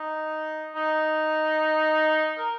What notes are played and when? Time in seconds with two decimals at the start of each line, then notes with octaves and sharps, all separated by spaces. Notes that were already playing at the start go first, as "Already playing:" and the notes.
Already playing: D#4
0.76 D#4
2.38 A#4